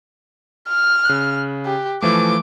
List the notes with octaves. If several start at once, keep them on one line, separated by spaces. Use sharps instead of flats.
F6
C#3 F#6
G4
E3 F3 A3 D6